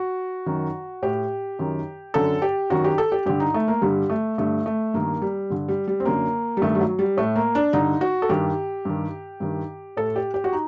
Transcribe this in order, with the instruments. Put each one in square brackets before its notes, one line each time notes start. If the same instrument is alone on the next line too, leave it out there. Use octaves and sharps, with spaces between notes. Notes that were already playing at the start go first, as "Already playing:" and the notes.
Already playing: [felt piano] F#4
F#2 D#3
A2 G4
F#2 D#3
F#2 D3 A4
G4
F#2 D#3 F#4
G4
A4
G4
G2 D3 G4
D#4
A3
A#3
G2 D3 G3
A3
G2 D3 A3
A3
G2 D#3 A#3
G3
G2 D3
G3
G3
C4
F#2 D3 A#3
G3
G2 D#3 A3
G3
F#3
G3
A2 A3
A#3
D4
G2 D3 D#4
F#4
A4
G2 D#3 G4
G2 D#3
G2 D#3
A2 A4
G4
G4
F#4
D#4